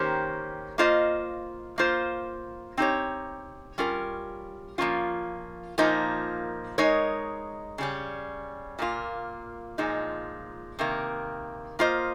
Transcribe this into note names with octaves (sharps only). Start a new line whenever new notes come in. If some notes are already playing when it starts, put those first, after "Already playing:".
Already playing: D#3 A#3 C#4 G4 C5
A#3 F4 C5 D#5
A#3 F4 C5
C4 D#4 G4 C#5
G3 C#4 F4 A#4
F3 A#3 C#4 F4
A#2 F3 A#3 D#4
G#3 D#4 A#4 C#5
C#3 G3 C#4
A#2 G3 A#3 F4
A#2 F3 G#3 D#4
C3 D#3 A#3
A#3 F4 C5 D#5